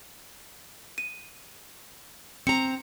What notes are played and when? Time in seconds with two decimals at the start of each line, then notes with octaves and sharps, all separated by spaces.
0.98 D#7
2.47 C4 A#5 C#7